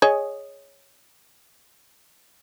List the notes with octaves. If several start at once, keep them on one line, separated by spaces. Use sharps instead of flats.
G#4 C#5 D#5